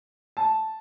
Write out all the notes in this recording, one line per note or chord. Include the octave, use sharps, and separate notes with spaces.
A5